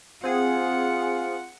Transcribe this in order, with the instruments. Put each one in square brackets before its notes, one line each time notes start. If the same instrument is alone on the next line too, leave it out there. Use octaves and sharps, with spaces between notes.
[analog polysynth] C4 G#4 [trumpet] F4 [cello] F#5